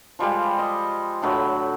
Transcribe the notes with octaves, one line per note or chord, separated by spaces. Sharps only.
F3 G3 G#3
D#5
A2 D3 F#3 B5